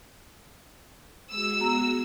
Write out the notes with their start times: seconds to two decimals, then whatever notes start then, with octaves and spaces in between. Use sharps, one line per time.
1.31 G#3 F#4 E6
1.60 B3 A#5